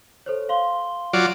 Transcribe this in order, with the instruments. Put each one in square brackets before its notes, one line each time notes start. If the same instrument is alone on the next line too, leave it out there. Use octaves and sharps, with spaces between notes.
[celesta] A4 C5 C#5
F5 C6 G7
[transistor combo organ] F#3 F4 D5